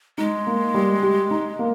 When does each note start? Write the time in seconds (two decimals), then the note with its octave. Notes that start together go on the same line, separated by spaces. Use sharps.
0.18 G#3 D#4
0.47 A#3
0.74 G3
1.03 G4
1.31 D#4
1.59 A#3